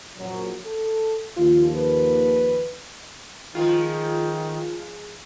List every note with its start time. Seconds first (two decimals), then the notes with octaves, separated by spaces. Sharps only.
0.16 A#1 F#2 F#3
0.65 A4
1.37 D#2 F3 F4
1.76 B4
3.55 D#3 F3 G#3 F4